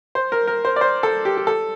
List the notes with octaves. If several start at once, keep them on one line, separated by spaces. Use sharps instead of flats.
C5
A#4
A#4
C5
D5
C5
A4
G4
G4
A4